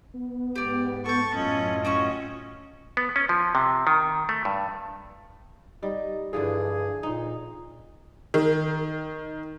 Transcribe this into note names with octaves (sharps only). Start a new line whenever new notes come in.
B3
G#2 G4 D5
A4 C#6 G6 A6
F#2 A2 C#4 F4 D#5
C4 C#4 F#4 C#6
B3
C#4
F3
C3
D#3
A3
G2
G3 D#4
G2 D3 E3 F3 G#4
A#2 D#4 C5
D#3